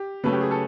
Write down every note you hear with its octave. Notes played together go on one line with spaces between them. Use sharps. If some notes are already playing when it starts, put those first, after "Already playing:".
Already playing: G4
C#3 F#3 A3 C#4 B4
G4
G#4
A4